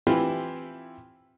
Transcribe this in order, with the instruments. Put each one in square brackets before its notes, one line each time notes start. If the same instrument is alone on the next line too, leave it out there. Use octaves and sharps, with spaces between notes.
[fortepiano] E3 C4 E4 F4 G4